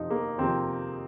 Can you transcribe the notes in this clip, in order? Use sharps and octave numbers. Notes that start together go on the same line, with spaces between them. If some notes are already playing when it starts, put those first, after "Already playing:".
Already playing: F2 C3 F3 D#4
A#3
F2 C3 F3 C4